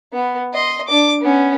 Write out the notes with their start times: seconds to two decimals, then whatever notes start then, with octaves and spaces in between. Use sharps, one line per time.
0.13 B3
0.53 D#5 C6
0.88 D4 D6
1.21 B3 C#4